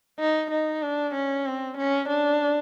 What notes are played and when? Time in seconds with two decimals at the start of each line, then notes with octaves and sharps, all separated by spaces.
0.19 D#4
0.51 D#4
0.83 D4
1.14 C#4
1.46 C4
1.78 C#4
2.09 D4